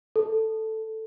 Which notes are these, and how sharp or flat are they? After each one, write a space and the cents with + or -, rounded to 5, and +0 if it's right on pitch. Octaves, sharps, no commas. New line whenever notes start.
A4 +0